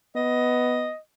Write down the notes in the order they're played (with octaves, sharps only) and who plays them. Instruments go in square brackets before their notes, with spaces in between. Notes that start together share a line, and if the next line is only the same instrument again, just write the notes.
[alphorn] B3 [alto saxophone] D#5